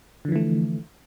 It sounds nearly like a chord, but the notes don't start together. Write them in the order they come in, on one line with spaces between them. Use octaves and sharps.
D3 F3 E3 A3